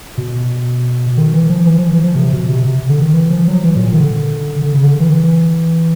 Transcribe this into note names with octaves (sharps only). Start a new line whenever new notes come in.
B2
D#3
E3
F3
E3
F3
E3
F3
C3
B2
C3
C3
D3
D#3
E3
F3
F#3
E3
A#2
D#3
D3
D3
C#3
D3
E3
E3